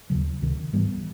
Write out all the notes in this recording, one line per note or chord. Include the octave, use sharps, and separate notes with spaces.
D#2 C#3 F#3
C#2 C3 D#3
G#2 E3 G3 B3